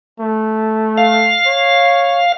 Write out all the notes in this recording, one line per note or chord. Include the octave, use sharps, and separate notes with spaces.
A3
F5
C#5